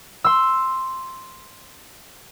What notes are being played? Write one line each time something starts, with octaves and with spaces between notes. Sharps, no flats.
C6 E6